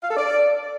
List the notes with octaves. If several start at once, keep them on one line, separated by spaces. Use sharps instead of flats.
F5
A4
D5